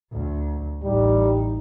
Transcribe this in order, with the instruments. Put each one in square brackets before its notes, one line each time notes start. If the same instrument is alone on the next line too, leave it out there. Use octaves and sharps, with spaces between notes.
[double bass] D2
[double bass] A1 D#4 [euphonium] G3